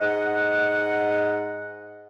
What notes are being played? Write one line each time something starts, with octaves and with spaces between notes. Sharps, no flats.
G#2 D#5 F#5